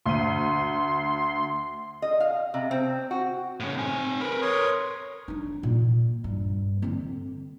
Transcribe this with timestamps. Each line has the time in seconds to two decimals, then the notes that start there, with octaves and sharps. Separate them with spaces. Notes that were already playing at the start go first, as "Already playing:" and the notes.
0.06 D2 C6 D#7
2.02 D#5
2.20 F5
2.54 C3
2.71 C4
3.11 F#4
3.60 A2 C#3
3.77 C4 G#5
4.21 A#4 B4 B5
4.42 C#5 C6 D#6
5.28 D4 D#4
5.63 A#2
6.24 G2
6.82 D3 C4